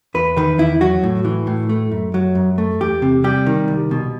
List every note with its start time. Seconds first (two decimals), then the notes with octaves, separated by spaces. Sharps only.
0.14 E2 B4
0.37 D#3 B4
0.58 E2 E4
0.81 F#3 F#4
1.03 A2
1.25 E3
1.47 A2
1.69 A3
1.92 F#2
2.14 F#3
2.35 F#2
2.58 A3
2.80 E2 G4
3.02 C3
3.24 G3 G4
3.46 D#3
3.68 C2
3.91 B2